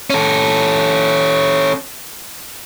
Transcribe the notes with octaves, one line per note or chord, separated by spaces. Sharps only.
C#4 A4